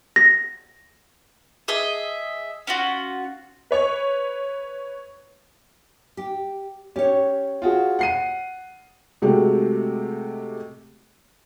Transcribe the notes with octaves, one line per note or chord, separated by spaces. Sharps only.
A#6
G#4 D#5 E5
C#4 F4 F#4
B4 C#5 C#6
G4
C#4 G4 C#5
F4 F#4 G#4
F#5 C7 D#7
C3 G#3 A3 F#4 G4